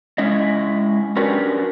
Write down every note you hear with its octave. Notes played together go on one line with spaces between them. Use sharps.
G#3 C#4 E4 D#5
C#4 D4 F#4 G4 A#4 B4